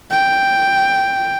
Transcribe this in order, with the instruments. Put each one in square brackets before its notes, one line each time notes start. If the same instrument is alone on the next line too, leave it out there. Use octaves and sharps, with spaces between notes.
[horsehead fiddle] G5